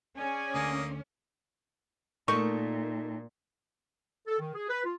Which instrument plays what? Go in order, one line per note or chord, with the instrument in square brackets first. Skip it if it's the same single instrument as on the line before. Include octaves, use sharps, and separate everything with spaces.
[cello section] C#4 [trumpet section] G#4 D5 G#5
[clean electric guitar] D2 D3 [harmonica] A#3 D#5
[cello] A#2 [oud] A3 D#4 A#4 [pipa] C#6
[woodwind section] A4
D#3
G#4
B4
F4